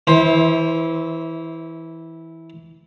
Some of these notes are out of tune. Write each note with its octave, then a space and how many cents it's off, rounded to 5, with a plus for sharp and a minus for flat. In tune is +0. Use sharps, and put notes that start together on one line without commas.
E3 -10 C5 +15 E5 -30